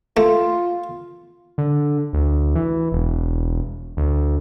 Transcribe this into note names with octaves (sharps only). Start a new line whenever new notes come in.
A3 F4
D3
D2
E3
E1
D2